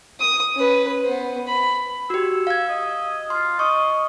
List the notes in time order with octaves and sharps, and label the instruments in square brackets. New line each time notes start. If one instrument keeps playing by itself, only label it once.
[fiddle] D#6
C#4 B4
B3 C5
B5
[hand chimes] F#4 G4 [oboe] E6
[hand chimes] F5 G#6
[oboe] D#5
[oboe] F4 [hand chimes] C6
[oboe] D#5 [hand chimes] C#6